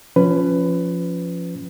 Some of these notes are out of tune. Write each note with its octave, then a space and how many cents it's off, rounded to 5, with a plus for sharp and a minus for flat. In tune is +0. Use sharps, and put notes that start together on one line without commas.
F3 +0 C#4 +0 B4 +15